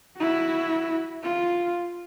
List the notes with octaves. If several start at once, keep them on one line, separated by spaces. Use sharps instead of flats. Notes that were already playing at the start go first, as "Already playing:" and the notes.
E4 F#4
F4